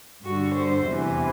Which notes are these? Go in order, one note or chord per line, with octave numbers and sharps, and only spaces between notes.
G2 D3 F#4
C5
E2 C3 E3